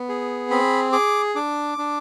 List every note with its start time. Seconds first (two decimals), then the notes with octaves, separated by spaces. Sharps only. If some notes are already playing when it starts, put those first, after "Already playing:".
Already playing: B3
0.09 G#4
0.50 C4 B5
0.92 G#4 D6
1.35 D4 D6
1.78 D4